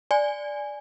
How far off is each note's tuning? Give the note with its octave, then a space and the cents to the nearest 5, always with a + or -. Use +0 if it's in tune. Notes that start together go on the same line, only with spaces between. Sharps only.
D5 +0 G#5 +0